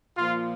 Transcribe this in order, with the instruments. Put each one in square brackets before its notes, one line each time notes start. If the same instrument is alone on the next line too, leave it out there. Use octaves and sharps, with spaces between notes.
[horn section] A#2 F3 F4